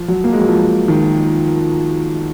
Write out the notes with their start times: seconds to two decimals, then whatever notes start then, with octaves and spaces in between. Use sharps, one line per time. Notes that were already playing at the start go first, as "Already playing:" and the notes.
Already playing: F3
0.08 F#3
0.24 A#3
0.33 G#3
0.41 F#3
0.48 F3
0.88 D#3